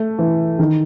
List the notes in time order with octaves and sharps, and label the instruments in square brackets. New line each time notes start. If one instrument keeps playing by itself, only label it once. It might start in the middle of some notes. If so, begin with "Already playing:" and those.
Already playing: [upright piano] A3
E3
D#3